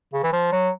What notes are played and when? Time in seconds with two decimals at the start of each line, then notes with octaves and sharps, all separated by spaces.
0.13 C#3
0.23 E3
0.32 F3
0.52 F#3